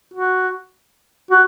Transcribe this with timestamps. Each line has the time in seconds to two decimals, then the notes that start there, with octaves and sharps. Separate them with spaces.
0.14 F#4
1.30 F#4